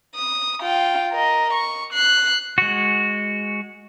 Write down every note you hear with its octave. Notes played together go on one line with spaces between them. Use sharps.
D#6
F4 G5
A#4 D#5
C#6
F#6 C7
G#3 F#4